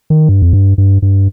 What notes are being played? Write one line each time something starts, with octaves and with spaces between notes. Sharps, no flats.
D#3
G2
F2
G2
G2
G2